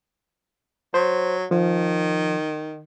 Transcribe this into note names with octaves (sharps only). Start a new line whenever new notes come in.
F#3 C5
D#3 F3